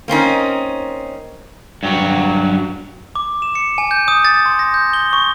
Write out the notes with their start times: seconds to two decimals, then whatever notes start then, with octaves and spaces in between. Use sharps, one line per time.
0.08 A#3 C4 C#4 D#4
1.83 G2 F#3
3.15 D6
3.42 E7
3.55 C#7
3.78 G#5
3.91 G6
4.08 D#6
4.25 A6
4.46 C6
4.59 A#6
4.74 G6
4.93 G7
5.13 C#6